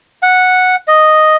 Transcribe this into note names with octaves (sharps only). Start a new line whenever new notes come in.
F#5
D#5